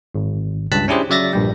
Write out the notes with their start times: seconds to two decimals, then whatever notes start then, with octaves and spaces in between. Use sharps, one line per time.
0.15 G#1
0.72 C#2 G2 A5 F#6 B6
0.88 C#4 D4 E4 G4 G#4 C5
1.09 C#3 F#3 D5 E5 A6 A#6
1.33 A#1 G2 G3